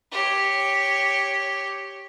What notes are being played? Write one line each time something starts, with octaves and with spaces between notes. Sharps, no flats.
G4 C#5